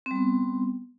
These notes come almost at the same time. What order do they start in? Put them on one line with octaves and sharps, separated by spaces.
C4 G3 B3